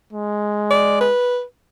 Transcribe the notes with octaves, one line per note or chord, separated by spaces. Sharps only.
G#3
D5
B4